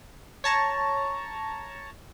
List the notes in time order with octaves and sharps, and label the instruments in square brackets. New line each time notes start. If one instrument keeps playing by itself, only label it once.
[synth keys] C#5 A5 A#5 C#6